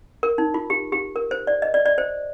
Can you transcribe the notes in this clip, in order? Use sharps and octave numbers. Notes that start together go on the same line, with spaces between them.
A#4
D#4
F4
G4
G4
A#4
C5
D5
D#5
D5
D5
C5